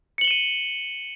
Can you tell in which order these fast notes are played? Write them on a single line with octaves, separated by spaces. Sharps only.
C#7 F#7 G7 E7 D#7